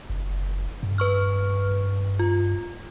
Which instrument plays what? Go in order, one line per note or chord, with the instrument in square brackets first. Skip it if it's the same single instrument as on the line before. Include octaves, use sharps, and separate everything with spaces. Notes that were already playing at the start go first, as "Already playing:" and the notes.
[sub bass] F#1
G2
[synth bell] B4 C#6 F6
F4